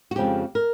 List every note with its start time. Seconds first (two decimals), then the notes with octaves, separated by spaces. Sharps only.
0.11 F#4
0.15 F2 C#3 F3 G#3 G4
0.55 A#4